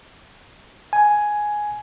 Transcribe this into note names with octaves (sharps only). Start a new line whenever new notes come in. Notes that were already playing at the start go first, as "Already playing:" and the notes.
G#5